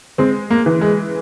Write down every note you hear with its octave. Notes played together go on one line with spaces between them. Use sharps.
G#3 C4
A#3
E3
G#3